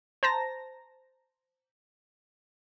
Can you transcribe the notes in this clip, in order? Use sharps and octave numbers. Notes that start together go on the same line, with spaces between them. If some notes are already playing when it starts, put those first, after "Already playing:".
C5 A5 A#5 A#6